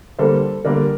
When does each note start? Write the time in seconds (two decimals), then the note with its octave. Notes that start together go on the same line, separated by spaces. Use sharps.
0.19 D3 G3 A#3 A4 C5
0.64 D3 G3 A#3 A#4 D5